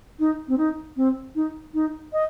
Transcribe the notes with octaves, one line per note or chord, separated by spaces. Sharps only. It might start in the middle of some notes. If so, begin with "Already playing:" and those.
D#4
C4
D#4
C4
D#4
D#4
D#5